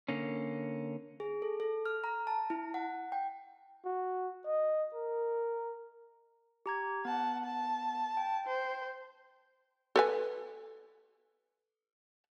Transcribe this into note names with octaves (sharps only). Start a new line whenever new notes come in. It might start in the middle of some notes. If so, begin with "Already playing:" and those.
D3 A#3 C#4
G#4
A4
A4
F6
A#5
A5
E4
F#5
G5
F#4
D#5
A#4
G4 A#5 G#6
B3 F#5 A5
A5
G5
C5
A4 B4 G#5